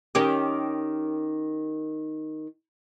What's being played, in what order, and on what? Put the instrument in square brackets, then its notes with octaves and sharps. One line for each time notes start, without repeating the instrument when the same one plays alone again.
[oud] D#3 C#4 G4